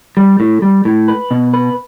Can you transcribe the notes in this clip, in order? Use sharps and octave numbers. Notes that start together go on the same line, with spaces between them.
G3
A2
G3
A2
B4
B2
B4